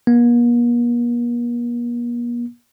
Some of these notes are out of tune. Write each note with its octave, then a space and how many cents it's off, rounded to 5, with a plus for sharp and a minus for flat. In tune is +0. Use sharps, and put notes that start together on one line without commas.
A#3 +45